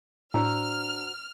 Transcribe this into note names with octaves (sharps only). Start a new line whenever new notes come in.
A2 D4 F#4 C5 A#5 E6 F6